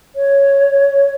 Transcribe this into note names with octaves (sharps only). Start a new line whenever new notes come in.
C#5